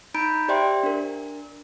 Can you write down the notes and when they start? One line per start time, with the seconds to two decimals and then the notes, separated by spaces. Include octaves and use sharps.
0.14 D#4 A#5 B5 G6 D7
0.48 G4 C5 D5 E5 G5 C6
0.83 D4 A#4